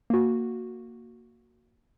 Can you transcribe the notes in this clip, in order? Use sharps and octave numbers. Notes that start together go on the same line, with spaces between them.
A#3 F#4